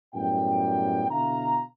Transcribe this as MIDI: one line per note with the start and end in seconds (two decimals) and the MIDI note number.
0.14 1.06 42
0.14 1.06 45
0.14 1.06 55
0.14 1.06 59
0.14 1.06 79
1.09 1.62 47
1.09 1.62 50
1.09 1.62 64
1.09 1.62 77
1.09 1.62 82